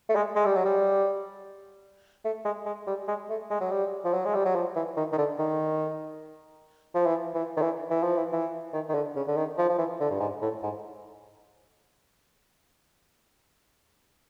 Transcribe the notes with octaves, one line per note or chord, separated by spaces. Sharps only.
A3
G#3
G#3
G3
F#3
G3
A3
G#3
G#3
G3
G#3
A3
G#3
F#3
G3
F3
F#3
G#3
G3
F#3
F3
E3
D#3
D#3
D3
D#3
F3
E3
E3
D#3
E3
E3
F3
E3
E3
D#3
D#3
D3
C#3
D3
D#3
F3
F3
E3
D3
G2
G#2
A2
G#2